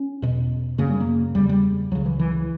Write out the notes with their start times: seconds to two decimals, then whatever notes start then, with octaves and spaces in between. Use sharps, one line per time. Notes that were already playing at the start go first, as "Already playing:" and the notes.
Already playing: C#4
0.22 E2 B2
0.78 F#2 C#3 A#3
0.90 G3
1.00 A#3
1.35 E2 C#3 G3
1.49 G3
1.91 C#2 C#3 F#3
2.06 E3
2.19 E3